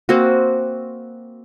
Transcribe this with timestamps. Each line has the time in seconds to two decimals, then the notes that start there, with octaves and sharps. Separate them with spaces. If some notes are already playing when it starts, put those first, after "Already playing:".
0.09 A#3 C4 F#4